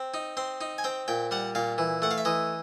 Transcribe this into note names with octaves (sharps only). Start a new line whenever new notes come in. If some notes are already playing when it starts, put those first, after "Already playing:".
Already playing: C4
D#4
C4 C6
D#4
G#5
C4 G5
A#2 G5
G3 F#5
A#2 F5
E3
A3 F#5
F5
E5
E3 D#5